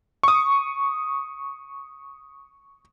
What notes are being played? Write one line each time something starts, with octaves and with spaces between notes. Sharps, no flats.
C#6 D#6